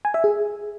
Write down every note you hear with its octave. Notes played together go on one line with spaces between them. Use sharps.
G#5
E5
G#4